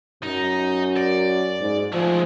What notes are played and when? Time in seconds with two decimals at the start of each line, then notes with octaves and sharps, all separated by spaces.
0.23 F#2 D#4
0.97 D5
1.61 G#2
1.93 F3 G#3 A3